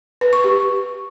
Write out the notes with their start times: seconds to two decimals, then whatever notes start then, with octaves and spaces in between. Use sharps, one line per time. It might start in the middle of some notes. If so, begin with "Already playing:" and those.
0.21 B4
0.33 C#6
0.44 G4